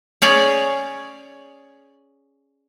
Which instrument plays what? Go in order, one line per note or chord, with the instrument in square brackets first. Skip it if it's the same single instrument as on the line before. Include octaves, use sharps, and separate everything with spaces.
[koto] C#4 G#4 C#5 D5